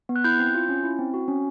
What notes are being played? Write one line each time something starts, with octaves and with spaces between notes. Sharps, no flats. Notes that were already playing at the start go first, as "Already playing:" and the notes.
B3
F#6
E4 G6
C4
F4
C#4
E4
C4
F#4
C#4